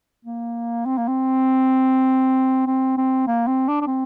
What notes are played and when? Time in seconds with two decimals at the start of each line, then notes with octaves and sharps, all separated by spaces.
0.25 A#3
0.86 C4
0.98 A#3
1.08 C4
2.66 C4
2.97 C4
3.27 A#3
3.47 C4
3.68 D4
3.81 D4
3.87 C4